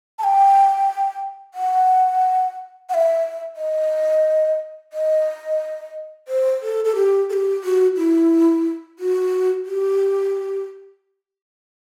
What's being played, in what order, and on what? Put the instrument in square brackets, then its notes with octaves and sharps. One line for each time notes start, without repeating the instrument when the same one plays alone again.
[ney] A5
G5
F#5
F#5
E5
D#5
D#5
C5
A4
A4
G4
A4
G4
F#4
E4
F#4
G4